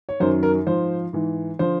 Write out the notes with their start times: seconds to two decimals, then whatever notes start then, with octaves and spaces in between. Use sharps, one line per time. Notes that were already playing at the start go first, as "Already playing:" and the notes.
0.09 C#5
0.20 F#2 D#3 F#3 C5
0.43 A#4
0.67 G#2 F3 C5
1.13 G#2 E3
1.59 D3 F3 C5